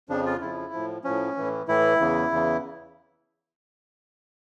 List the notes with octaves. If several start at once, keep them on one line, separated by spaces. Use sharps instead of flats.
F2 C#3 F3 D4
F4
F2 C#3 F3 E4
A2 F3
A2 F3 C#4
A2 E3
A2 E3 E4
E2 C#3 E3
E2 C#3 E3